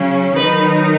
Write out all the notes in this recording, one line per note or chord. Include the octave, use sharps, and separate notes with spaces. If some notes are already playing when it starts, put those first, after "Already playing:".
Already playing: C#3 F#3 C#4
D#3 F#3 D#4 B4